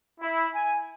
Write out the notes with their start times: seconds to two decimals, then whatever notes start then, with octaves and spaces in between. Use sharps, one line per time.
0.20 E4
0.54 G#5